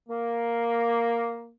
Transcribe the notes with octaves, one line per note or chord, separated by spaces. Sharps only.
A#3